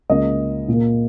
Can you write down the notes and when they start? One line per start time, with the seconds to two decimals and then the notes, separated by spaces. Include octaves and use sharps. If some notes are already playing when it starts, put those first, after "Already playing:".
0.10 C#2 C#3 A#3 D#5
0.68 A#2 A#3